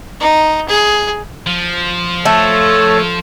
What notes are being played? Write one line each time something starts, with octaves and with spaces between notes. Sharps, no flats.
D#4
G#4
F3
A3 A4 C#5